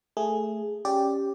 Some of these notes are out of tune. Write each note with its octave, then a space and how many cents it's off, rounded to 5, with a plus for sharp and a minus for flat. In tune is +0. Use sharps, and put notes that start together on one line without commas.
A3 +0 G#4 +0
C#4 +0 G4 +0 D5 +0